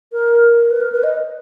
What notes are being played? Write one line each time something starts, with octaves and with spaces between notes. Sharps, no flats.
A#4
B4
A#4
B4
D#5